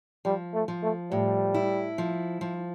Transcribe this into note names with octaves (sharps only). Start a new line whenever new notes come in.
F3 G3
A3
F3
A3
A2 G3
E4
F3
F3